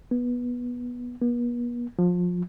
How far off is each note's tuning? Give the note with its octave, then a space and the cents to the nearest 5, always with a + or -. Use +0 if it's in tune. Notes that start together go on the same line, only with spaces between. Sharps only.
B3 -15
B3 -45
F3 +25